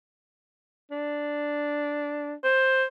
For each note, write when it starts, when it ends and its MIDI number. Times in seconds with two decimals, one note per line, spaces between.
0.91 2.34 62
2.44 2.84 72